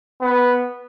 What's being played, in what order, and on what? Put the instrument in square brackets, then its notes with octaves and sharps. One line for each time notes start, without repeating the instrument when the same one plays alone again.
[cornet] B3